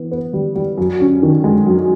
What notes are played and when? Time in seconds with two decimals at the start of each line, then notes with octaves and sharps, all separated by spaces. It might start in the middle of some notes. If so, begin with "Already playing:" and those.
Already playing: E3 B3
0.11 B3
0.33 G3
0.55 G3
0.78 F#2
1.00 C#4
1.22 D#3
1.44 G#3
1.67 F#2